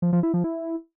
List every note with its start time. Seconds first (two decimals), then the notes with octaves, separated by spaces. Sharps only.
0.02 F3
0.13 F3
0.23 E4
0.34 F3
0.44 E4